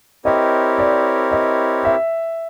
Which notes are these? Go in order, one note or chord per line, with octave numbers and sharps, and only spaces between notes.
C4 E4 G4 A#4 C#5 D#5
D5
D#5
E5